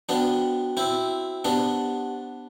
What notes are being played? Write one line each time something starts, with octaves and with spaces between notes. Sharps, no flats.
B3 D4 F#4 C5 G5
C4 E4 F#4 C5 G5
B3 D4 G4 C5 F#5 A5